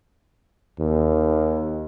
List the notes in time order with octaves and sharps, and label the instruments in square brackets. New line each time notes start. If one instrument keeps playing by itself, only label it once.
[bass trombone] D#2